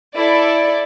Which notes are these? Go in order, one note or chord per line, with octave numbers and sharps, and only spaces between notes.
E4 A4 D5